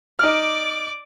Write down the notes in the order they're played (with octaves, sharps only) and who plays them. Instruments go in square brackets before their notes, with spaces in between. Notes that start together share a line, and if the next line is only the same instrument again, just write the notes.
[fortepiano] D#4 F6 [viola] D5 D6